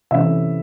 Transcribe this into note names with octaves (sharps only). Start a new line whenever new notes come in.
C3 E3 A3 C#4 E5